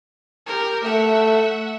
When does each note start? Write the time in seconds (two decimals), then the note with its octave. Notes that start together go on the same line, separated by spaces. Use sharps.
0.46 G4 A#4
0.84 A3 E5 F#5